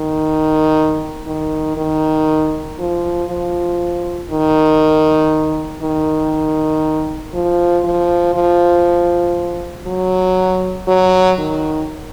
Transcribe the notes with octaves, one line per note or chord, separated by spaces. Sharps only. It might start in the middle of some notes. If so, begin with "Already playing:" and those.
Already playing: D#3
D#3
D#3
F3
F3
D#3
D#3
F3
F3
F3
F#3
F#3
D#3